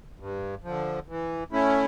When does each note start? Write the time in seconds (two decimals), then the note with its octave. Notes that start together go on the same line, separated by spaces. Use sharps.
0.20 G2
0.64 D3 F3
1.09 E3
1.52 A3 C#4 E4